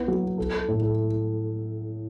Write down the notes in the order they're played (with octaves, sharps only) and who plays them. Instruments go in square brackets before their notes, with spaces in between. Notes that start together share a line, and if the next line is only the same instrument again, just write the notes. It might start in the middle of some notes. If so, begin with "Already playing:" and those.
Already playing: [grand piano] B3 E4
F#3
B3
A4
A4
A2
A4